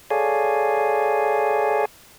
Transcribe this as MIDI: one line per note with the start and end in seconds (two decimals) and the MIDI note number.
0.10 1.85 68
0.10 1.85 69
0.10 1.85 73
0.10 1.85 74
0.10 1.85 77
0.10 1.85 80